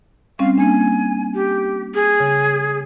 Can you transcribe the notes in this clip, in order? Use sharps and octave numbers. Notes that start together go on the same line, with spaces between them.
G3 C4 C#4 F5
A#3 D4 G#5
G4
G#4
C#3